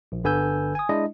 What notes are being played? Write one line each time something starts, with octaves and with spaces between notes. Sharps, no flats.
A#1
G1 D3 B4 G#5 E6 G6
G#5 D#6
G#3 D4 E4 D#5